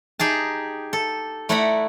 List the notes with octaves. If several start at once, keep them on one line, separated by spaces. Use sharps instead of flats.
D#4 G4 G#4 A5
A4
A3 E4 D5 F#5 A#5 B5